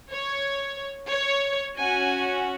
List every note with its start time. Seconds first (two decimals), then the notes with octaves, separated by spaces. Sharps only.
0.11 C#5
1.11 C#5
1.78 C#4 F#4 G#5